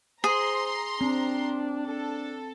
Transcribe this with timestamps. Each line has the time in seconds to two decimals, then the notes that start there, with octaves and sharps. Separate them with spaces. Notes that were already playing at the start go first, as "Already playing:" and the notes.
0.24 G#4 C5 A#5 C6
1.01 C4 D4
1.86 D4 A4